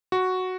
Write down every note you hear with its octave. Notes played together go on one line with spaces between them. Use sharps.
F#4